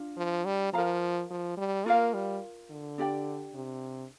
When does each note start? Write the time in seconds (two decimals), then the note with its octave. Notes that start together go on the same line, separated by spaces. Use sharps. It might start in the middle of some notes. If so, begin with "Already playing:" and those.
Already playing: D4 F4
0.17 F3
0.45 G3
0.73 F3 A#4 F5 A#5
1.30 F3
1.57 G3
1.86 A#3 F4 A#4 F5
2.14 G3
2.70 D3
2.98 D4 G4 D5 G5
3.54 C3